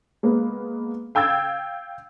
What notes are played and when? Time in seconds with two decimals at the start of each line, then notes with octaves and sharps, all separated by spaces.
0.23 G#3 A#3 B3
1.15 F5 G5 E6 G#6 A6